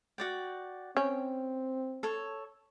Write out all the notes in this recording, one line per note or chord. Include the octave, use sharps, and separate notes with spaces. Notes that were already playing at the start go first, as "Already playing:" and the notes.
F#4 D5 G5
C4 C#4 G5
A4 C#5